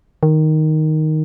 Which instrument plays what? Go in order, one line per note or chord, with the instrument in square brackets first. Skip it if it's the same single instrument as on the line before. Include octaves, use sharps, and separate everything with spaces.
[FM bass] D#3